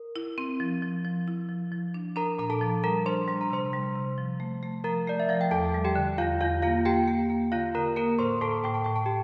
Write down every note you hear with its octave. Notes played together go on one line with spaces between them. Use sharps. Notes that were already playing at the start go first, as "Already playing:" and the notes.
Already playing: A#4
E4
C4
F3
F3
F3
E4
F3
F3
D4
D4 A#4 A#5
A#2 A#5
A4 A5
F3
G3 A#4 A#5
D4 C5 C6
G3 C6
A#5
C3 C5 C6
G3
C3
F3
A3
A3
F3 A#4 A#5
A3 D5
E5
F3 F5
G5
E2 A4 A5
G3
G4 G5
D3
E2 F4 F5
E2 F4 F5
A#3 F4 F5
A#3 G4 G5
A#3
A#3
D3 F4 F5
D3 A#4 A#5
A#3 A#4 A#5
A2 C5 C6
A2 A4 A5
A2 G5
A5
A2 G5
A5
G4 G5